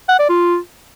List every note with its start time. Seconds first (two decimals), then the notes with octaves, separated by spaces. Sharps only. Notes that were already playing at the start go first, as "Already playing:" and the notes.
0.09 F#5
0.19 D5
0.29 F4